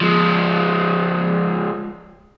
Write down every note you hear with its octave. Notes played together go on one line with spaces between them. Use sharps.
F3 G#3